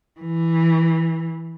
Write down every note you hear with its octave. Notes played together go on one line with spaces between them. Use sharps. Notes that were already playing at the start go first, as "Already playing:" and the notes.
E3